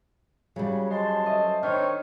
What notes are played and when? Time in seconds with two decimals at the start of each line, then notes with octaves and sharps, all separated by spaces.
0.56 C#3 F#3 G3
0.91 G#3 C#4 C5 A5
1.26 A3 D#5
1.63 D#3 C4 D4 C#5